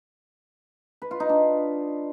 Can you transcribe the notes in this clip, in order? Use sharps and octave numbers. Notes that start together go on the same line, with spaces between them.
B4
F4
D#4
D4